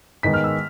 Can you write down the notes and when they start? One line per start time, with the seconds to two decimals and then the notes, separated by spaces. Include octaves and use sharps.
0.23 G#2 D#3 G#3 B3 B6
0.34 F6
0.44 E6